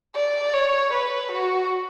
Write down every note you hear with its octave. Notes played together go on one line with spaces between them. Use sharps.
D5
C#5
B4
F#4